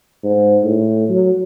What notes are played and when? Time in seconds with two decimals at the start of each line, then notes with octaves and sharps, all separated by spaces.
0.24 G#2
0.64 A2
1.09 F#3